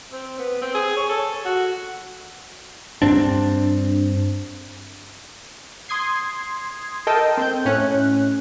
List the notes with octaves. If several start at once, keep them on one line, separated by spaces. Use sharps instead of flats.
C4
B3
C4
G#4
C#5
A4
F#4
G2 C4 D4
C6 D#6 G#6 C7
A4 A#4 D#5 G5 A5
C4 G6
A2 C#4 F#6